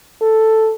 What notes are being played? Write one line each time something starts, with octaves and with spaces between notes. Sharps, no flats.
A4